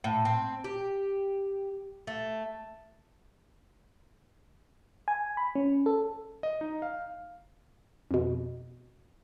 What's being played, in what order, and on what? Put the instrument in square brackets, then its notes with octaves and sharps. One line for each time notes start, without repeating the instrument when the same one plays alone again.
[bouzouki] A2
C4
G4
A3
[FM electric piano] G#5
B5
C#4
A4
[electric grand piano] D#5
D#4
F5
[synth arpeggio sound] F2 B2